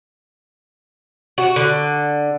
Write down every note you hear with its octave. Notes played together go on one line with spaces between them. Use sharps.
F#4
D3